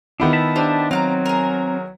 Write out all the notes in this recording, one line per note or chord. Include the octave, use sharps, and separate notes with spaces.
D#3 B3 D4 E4 F4 G4
E5 A5 B5
D4 G4 C5 D#5
F#3 C4 F5 F#5 A#5
G#4 A#4